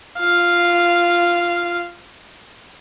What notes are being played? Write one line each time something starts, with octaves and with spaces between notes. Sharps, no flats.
F4 F5